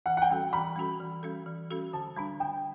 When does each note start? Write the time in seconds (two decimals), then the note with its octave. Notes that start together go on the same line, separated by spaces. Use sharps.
0.06 E3 F#5
0.17 F#5
0.22 G5
0.29 G3 C#4 F#4 A4
0.53 E3 B5
0.76 G3 C#4 F#4 A4
1.00 E3
1.23 G3 C#4 F#4 A4
1.46 E3
1.71 G3 C#4 F#4 A4
1.93 D3 A5
2.16 G3 D4 B5
2.40 D3 G5